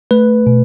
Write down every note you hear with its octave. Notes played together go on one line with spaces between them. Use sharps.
A3 B4
B2